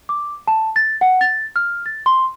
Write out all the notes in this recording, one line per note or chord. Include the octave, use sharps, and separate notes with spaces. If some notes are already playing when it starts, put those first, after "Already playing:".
D6
A5
A6
F#5
A6
F6
A6
C6